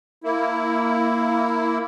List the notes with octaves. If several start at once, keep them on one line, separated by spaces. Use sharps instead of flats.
A#3 E4